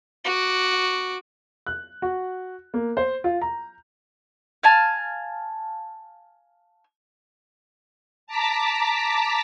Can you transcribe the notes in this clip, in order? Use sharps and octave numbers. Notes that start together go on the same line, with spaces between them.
F#4 D6
F#6
F#4
A#3
C5
F4
A#5
F5 G#5 A5
A5 A#5 D6 B6